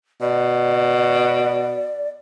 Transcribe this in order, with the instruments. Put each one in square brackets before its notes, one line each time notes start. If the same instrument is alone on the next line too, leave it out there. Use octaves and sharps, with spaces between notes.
[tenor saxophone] B2 [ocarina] D5